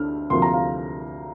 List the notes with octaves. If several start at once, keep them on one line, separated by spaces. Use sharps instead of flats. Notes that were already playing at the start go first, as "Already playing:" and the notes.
Already playing: D2 D3 D4 F6
D2 C3 F3 A#3 C6
A#5
F5